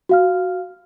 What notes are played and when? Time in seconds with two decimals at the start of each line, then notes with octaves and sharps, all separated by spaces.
0.09 F#4 F5 F6